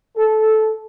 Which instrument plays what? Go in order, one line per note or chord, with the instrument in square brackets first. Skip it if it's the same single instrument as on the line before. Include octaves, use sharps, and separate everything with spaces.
[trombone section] A4